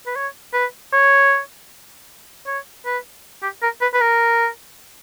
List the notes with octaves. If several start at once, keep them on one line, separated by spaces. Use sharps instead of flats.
B4
C#5
B4
C#5
C#5
B4
G4
A#4
B4
B4
A#4